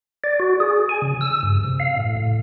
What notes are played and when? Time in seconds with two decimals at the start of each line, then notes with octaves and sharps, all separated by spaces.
0.24 D5
0.40 F#4
0.60 G#4
0.89 G#5
1.02 C#3
1.21 E6
1.43 G2
1.64 C3
1.80 F5
1.97 A2
2.17 A2